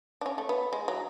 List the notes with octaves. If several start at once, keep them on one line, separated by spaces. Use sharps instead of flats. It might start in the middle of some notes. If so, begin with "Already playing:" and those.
D4
C#4
A3
B3
G#3
F#3